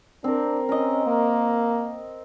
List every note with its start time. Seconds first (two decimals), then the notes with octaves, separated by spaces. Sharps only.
0.24 C4 D4 A#4
0.69 C#4 A#4 D#5
1.07 A#3